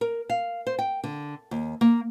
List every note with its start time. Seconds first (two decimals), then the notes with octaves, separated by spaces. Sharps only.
0.01 A#4
0.30 F5
0.67 C5
0.79 G5
1.04 D3
1.51 D#2
1.81 A#3